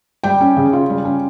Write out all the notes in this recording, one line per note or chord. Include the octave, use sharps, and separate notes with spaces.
G3 G5
C#4
C#3
F4
G3
C#4